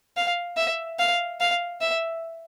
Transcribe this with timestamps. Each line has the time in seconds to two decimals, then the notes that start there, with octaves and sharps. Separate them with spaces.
0.17 F5
0.57 E5
0.99 F5
1.40 F5
1.81 E5